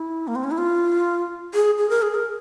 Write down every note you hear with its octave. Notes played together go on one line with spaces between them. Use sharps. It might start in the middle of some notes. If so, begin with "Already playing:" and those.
Already playing: E4
A#3
C4
C#4
E4
F4
G#4
G#4
A#4
G#4
A#4